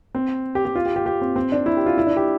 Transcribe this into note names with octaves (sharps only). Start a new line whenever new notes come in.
C4
G4
G4
F4
G4
G4
G4
C4
C4
D4
E4
G4
F4
E4
D4
G4